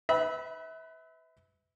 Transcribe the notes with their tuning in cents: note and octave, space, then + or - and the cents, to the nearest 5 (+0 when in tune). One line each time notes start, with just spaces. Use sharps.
B4 +25 E5 -30 B5 -20